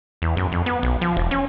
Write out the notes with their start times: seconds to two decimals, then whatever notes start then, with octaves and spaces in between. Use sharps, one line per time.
0.22 E2
0.37 F#2
0.52 F2
0.66 B3
0.83 B1
1.01 F3
1.17 E1
1.31 C#4